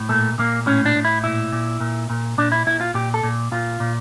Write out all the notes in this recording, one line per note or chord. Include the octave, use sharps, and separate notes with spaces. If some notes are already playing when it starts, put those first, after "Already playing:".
Already playing: A2
A#2 A3
A#2 A#3
A2 C#4
D4
A2
E4
A#2 E4
A#2
A#2
A#2
A#2 D4
E4
A#2 E4
F4
A#2 G4
A4
A#2
A#2 F4
A#2